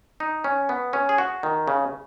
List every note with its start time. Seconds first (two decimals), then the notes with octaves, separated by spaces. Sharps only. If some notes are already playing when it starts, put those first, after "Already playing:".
0.20 D#4
0.44 C#4
0.69 B3
0.93 C#4
1.09 G#4
1.18 F#4
1.43 D#3
1.68 C#3